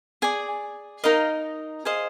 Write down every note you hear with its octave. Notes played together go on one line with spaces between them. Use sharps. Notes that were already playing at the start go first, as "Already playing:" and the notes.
G#4 D5 G#5
D#4 A#4 D#5 F5
G#4 C5 D#5 F5